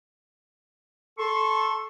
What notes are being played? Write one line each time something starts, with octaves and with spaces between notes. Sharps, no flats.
A4 C6 C#6